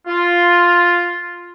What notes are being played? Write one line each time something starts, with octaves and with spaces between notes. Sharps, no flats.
F4